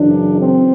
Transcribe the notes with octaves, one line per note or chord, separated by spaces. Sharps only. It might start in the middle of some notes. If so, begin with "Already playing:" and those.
Already playing: F#2 C#3 E3 D4
C4